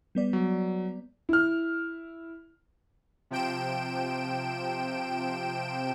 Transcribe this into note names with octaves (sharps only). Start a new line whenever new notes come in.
G3 B3 D5
F#3
E4 F6
C3 F3 G5 D7 E7